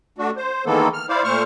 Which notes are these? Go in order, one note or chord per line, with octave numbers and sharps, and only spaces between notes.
A3 D4 F#4
C5
D#3 E3 G#3 A#3 B3 A4
F6
E4 C5 D5 F5
A#2 A3 C5 C#6 F6